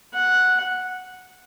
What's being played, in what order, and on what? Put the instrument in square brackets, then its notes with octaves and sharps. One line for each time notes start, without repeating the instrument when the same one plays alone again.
[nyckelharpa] F#5